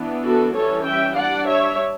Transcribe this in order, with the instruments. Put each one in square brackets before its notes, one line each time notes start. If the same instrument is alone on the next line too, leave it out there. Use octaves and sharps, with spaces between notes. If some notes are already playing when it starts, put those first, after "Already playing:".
Already playing: [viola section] E3 B3 D4
F#4 A4
E3 G3 C#4 A4 C#5
E5 G5
G3 D4 D5 F#5
C#5 E5